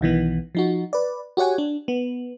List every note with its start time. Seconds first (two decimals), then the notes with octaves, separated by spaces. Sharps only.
0.01 B1 D#3 E3 B3
0.55 F3 D#4 F#4
0.93 B4 D5
1.37 F#4 G4 C#5 F#5 G#5
1.58 D4
1.88 B3